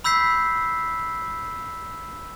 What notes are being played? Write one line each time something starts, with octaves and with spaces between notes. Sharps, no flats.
B5 E6 G6 B6 C7